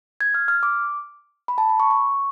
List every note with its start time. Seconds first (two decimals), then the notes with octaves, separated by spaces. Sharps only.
0.21 G#6
0.34 F6
0.48 F6
0.63 D6
1.48 B5
1.58 A5
1.69 B5
1.80 C#6
1.90 C#6